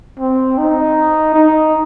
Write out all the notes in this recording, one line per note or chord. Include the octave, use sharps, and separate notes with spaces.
C4
D#4
D#4